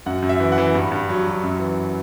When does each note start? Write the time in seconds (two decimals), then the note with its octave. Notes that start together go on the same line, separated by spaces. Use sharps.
0.06 F#2 F#5
0.22 F#2
0.29 E5
0.40 E3
0.52 F#5
0.58 E3
0.75 G2
0.92 G2
1.09 F#3
1.26 F#3
1.44 F#2
1.60 E3